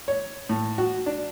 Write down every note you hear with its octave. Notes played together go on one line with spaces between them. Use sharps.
C#5
A2
F#4
D4